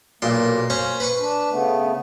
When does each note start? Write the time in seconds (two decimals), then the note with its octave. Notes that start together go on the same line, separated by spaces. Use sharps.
0.22 B1 A#2 A#3 C6
0.70 C#4 C5 C#6
1.00 B4 B5 C#6
1.19 D4
1.51 C#3 A3 B3